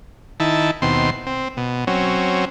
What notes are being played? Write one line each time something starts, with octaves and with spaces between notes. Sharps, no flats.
D#3 E4 A5
D#2 B2 C4 C6
C4
B2
F#3 C4 C#4